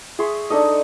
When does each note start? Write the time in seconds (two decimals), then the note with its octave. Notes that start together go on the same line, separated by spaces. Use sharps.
0.19 G#4 E5 C6 C#6
0.50 D4 D#4 A4 D#5